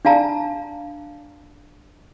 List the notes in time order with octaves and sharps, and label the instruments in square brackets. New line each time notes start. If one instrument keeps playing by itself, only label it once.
[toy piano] D4 D5 F5 A5 A#5